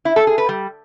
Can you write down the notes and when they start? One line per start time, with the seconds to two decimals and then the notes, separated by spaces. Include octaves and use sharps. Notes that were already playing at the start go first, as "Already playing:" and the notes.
0.05 E4
0.16 A4
0.27 G#4
0.38 B4
0.49 G3